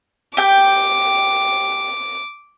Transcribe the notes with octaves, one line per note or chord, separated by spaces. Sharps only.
G4 G5 D6 G6